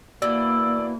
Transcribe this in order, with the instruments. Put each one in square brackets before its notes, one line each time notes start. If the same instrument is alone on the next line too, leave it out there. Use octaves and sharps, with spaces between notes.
[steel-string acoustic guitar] B2 E3 [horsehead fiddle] A#3 [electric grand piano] D5 [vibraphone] E6